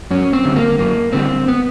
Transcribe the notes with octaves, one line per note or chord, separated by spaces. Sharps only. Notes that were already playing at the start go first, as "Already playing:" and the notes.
F#2 C#4
C4
D3 G3
A#3
F#2 A#3
D3 G3 C4
B3